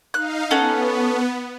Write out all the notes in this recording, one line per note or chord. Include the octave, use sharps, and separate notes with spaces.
D#4 F5 F#6
B3 C#4 A4 F#5